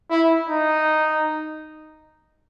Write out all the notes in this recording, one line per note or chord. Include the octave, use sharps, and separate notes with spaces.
E4
D#4